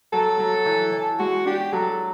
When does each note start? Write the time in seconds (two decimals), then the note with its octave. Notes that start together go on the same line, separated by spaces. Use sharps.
0.13 F#3 A4
0.39 F#3
0.66 E3
0.93 E3
1.19 G#3 F#4
1.46 D4 G4
1.73 F#3 A4